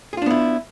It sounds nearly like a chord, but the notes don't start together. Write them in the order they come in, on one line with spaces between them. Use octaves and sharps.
G#4 F4 D4 B3 E4